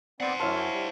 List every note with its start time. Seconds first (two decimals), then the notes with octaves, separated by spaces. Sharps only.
0.20 B3 C4 C5 D5 F#5
0.40 F#2 E4 C#5 F5 A5 C6 F6
0.73 G3